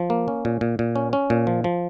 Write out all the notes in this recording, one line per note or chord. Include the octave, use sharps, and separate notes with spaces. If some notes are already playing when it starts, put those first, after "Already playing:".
Already playing: F3
A#3
C#4
A#2
A#2
A#2
C#4
C#4
A#2
F3
F3